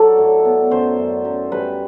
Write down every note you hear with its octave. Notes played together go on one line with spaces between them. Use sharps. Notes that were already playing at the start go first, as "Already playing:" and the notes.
Already playing: F#3 A4 D5
A2
B3
F#2 C5
F#2
F#2
G3 B4